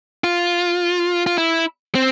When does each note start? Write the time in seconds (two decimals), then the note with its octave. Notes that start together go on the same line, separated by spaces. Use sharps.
0.24 F4
1.26 F4
1.38 E4
1.95 C4